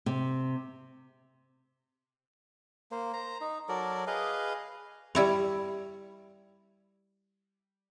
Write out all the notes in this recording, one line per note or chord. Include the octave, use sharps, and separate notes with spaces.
C3
A#3 C5
C5 A#5
D#4
F#3 A4 A#4 D5
G#4 B4 D#5 F5
G3 E4 C#5